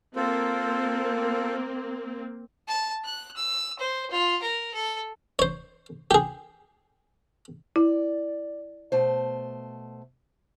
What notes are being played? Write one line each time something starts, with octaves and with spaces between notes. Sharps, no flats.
A#3 C4 F4 A4 C5
A5
F#6
E6
C5
F4
A#4
A4
C5 C#5
G4 G#4
E4 D5
B2 A3 C5